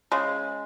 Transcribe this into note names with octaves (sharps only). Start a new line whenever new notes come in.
C#3 G#3